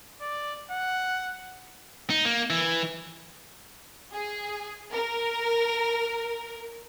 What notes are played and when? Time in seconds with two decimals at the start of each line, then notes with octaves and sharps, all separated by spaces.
0.21 D5
0.71 F#5
2.10 D#4
2.25 A#3
2.50 E3
4.13 G#4
4.92 A#4